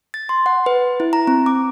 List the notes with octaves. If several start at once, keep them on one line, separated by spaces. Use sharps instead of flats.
A6
C6
F#5
B4
E4
A#5
C4
D6